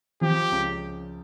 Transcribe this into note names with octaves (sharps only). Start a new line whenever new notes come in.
F3 G4
C#2